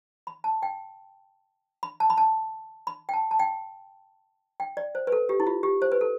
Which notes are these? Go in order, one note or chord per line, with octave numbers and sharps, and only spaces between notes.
B5
A5
G5
B5
A5
B5
A5
B5
G5
A5
A5
G5
G5
D5
C5
B4
A4
G4
E4
F4
G4
C5
B4
A4